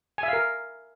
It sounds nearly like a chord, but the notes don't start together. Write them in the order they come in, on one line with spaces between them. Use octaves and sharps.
G#5 E5 F5 A#4